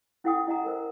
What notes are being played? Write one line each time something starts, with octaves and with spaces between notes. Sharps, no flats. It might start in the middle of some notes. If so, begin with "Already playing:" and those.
C#4 E4 A4 F#5 G5 D#6
E4 D#5 F#5 A#5
A4 A#4 C5